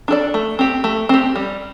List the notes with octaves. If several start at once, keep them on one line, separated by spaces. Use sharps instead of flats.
D4 A4 D5
A3
C4 G4
A3
C4 G4
G3